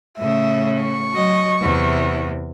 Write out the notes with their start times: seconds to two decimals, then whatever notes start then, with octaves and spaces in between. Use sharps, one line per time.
0.18 A2 C#3 E5
0.83 C#6
1.12 F#3 D#5
1.61 E2 C3